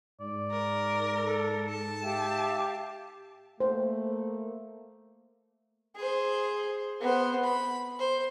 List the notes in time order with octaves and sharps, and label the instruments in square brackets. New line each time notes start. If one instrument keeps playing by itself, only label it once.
[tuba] G#2 [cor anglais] D5
[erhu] A#4
[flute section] A4
[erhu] A5
[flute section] G4 F5 G5 [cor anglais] E5
[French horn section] A3 A#3 [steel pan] C5
[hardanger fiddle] G#4 C5
B3 C5
B5
C5